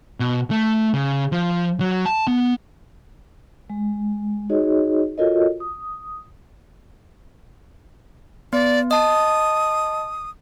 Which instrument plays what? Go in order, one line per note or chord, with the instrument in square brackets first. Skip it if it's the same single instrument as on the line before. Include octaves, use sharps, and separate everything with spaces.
[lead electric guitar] B2
A3
C#3
F3
F#3
A5
B3
[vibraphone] G#3
D#4 F#4 G#4 C#5 D#5
F4 F#4 A4 A#4 C#5 D#5
D#6
[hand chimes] B3 [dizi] D5
[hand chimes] D#5 A5 [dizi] D#6